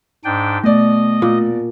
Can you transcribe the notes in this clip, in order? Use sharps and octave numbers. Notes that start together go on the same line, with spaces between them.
G#2 D4 G5
B2 A3 D5 D#5
A#2